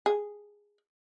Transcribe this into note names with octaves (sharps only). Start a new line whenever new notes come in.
G#4